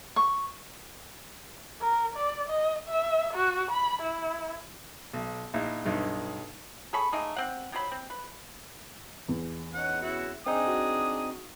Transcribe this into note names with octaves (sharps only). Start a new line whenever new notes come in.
C#6
A#4
D5
D#5
E5
F#4
B5
E4
B1
A#1 D#4 E4
B1 G2 D#4 E4
G#4 A4 B5 C#6
A3 A#3 D#4 G#4
C4 F#5
D#3 F#3 C5 B5
C4
B4
E2
C#4 D#4 F#5
C#4 E4 F#4
C4 D4 D#4 G#4 G#5 D#6
F#4